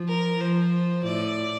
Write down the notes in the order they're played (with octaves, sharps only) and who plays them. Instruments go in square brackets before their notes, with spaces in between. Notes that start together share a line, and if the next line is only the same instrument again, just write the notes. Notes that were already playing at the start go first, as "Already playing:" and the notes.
Already playing: [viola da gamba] F3
[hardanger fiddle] A#4
[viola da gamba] F3 [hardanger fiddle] C5
[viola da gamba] A2 [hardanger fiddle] D5